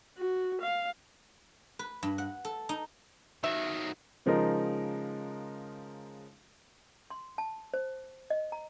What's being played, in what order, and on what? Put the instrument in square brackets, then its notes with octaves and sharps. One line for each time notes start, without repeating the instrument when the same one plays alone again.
[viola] F#4
F5
[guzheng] B4
G2
F#5
A4
D#4
[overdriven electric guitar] D#3 F#3 [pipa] E5
[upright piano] C#3 F3 G#3 D#4 A#4
[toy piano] C6
A5
C5
D#5
A#5